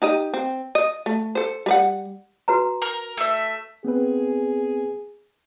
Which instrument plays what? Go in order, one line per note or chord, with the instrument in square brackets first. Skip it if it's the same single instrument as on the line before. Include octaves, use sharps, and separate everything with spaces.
[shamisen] D#4 G4 D#5
C4
D#5
A3
A4 C5
G3 B4 F#5
[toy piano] F#4 B4 A#5
[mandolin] A#4
A3 E5
[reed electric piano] B3 C4 B4 [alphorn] G#4